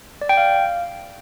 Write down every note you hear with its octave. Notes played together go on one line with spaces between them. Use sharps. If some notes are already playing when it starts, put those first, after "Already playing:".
D5
G5
F5